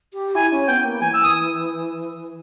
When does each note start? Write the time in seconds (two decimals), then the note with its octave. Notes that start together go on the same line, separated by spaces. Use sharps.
0.14 G4
0.35 E4 G#5
0.52 C#4
0.68 B3 G5
0.85 A#3
1.01 E3 G#5
1.14 E6
1.24 D#6